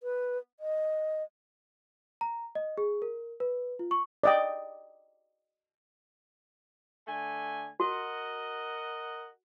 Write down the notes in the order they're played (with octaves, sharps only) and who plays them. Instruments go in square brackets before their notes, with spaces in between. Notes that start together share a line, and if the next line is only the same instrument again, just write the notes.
[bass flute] B4
D#5
[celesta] A#5
D#5
G#4
A#4
B4
F4
C#6
[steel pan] D5 D#5 G5
[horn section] D3 A3 G#5
[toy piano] F#4 [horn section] A#4 D#5 F#5